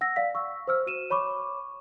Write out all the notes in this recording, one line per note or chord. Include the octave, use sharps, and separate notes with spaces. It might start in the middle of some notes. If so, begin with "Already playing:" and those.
F#5 E6 A#6
D5 F5 B6
C#6 E6
C5 E6 F6
F#4 D#7 E7
C#5 B5 C#6 D6